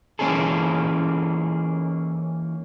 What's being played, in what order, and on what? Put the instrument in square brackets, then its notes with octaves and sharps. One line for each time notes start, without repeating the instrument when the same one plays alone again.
[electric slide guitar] E3 A#3 C#4 D#4 G#4 A4